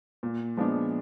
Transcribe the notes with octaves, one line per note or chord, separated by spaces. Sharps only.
A#2
F3 G#3 B3 D4